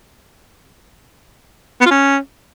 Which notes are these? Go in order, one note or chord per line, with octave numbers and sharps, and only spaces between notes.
B3
F4
C#4